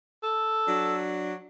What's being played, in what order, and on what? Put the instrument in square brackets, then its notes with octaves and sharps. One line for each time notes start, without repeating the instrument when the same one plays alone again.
[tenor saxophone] A4
[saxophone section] F#3 D4